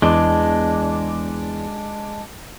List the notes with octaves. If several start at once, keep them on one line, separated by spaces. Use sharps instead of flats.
E2 G#3 D4